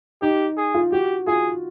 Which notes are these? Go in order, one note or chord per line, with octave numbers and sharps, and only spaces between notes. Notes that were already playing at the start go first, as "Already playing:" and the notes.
D#4 G4
G#4
F4
F#4 G4
F4 G#4